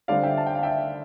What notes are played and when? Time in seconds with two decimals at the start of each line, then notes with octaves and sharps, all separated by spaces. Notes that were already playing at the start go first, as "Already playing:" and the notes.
0.08 D3 G3 C4 D5 F5
0.23 E5 G5
0.37 A5
0.46 G5
0.55 F5
0.63 E5 G5